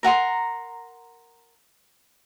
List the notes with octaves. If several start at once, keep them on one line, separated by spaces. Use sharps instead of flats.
A#4 F#5 A#5 C6